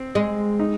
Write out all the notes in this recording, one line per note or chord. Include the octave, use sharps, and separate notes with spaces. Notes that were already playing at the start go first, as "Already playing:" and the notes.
Already playing: C4
G#3
D#4